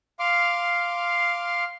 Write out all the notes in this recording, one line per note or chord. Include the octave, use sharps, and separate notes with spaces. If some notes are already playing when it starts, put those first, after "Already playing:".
F5 C6 D6 F6